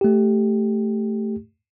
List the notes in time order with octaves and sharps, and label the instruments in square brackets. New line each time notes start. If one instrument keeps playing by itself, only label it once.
[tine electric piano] A3 G4